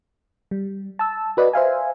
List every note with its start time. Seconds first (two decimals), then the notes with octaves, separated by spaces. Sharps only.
0.51 G3
0.99 A5 E6
1.37 F#4 B4 D5 D#5
1.53 C5 E5 F5 G#5